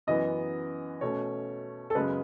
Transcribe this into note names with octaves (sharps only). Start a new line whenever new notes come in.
F#2 E3 B3 D#5
B2 A3 C#4 C#5
A4
F#2 C#3 G#3 B3 B4